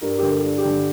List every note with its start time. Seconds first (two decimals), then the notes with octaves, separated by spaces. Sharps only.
0.01 G2 A#4
0.18 D3 G4
0.30 A4
0.43 G2
0.58 G4
0.65 D3